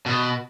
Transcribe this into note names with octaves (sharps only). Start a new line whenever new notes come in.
B2